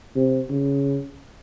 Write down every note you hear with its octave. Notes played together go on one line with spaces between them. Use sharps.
C3
C#3